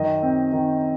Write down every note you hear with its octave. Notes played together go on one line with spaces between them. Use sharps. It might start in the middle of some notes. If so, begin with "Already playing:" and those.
Already playing: F#2 D#3 D#5
C4
D#3